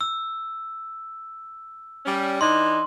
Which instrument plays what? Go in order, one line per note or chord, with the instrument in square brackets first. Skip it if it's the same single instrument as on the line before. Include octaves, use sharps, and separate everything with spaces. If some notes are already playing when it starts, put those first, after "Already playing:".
[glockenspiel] E6
[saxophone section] G3 C#4
[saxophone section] E3 D4 D#4 [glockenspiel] C6